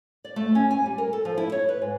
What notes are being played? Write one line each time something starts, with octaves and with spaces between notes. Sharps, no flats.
D5
A3
C#4
G#5
G3
A#4
A4
F3
E4
C#5
B4
G#2